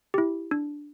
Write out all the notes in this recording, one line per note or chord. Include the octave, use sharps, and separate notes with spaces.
E4 G4
D4